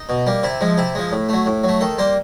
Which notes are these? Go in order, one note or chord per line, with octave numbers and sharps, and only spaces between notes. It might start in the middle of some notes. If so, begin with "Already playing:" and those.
Already playing: D#4
B2
G3 A#3
C3 E4
F3 G#3
C3 E4
F3 G#3
A2
F#3 A3
A2
F#3 A3
D#3 A4
G3 A#3 C5